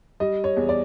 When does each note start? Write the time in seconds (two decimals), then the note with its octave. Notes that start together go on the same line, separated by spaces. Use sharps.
0.20 G3 D#5
0.44 C#5
0.57 E2
0.69 D5